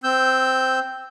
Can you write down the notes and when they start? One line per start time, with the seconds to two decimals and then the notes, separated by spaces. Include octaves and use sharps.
0.04 C4 E6 G6